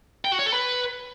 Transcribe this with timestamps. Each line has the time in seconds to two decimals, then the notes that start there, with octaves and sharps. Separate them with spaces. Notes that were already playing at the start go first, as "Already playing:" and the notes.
0.25 G5
0.32 F#4
0.39 C#5
0.46 A4
0.53 B4